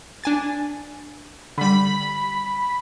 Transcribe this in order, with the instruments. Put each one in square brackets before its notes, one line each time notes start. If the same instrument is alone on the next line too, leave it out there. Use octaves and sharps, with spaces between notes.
[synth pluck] D4 G#5 A6
[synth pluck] D3 G3 [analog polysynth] B5